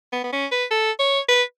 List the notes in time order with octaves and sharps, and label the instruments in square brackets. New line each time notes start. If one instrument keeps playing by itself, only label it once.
[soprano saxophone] B3
B3
C#4
B4
A4
C#5
B4